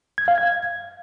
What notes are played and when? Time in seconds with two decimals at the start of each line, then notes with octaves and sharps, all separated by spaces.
0.18 G#6
0.28 F5
0.38 G#6